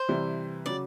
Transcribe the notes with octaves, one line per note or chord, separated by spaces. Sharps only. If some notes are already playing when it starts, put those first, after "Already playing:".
Already playing: C5
C3 E3 G3
C#3 F#3 D5